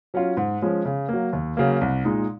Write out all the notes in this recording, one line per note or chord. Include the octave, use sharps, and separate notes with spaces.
F#3 C#4 F4
G#2
F3 G#3 C#4
C#3
F#3 A#3
D#2
C#3 F#3 A#3
C2
A#2 G#3 D#4